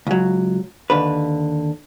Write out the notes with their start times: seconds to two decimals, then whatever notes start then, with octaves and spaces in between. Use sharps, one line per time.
0.07 C#2 F#3
0.90 D#2 D3 B4